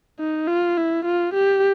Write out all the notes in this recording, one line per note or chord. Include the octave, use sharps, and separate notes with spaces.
D#4
F4
E4
F4
G4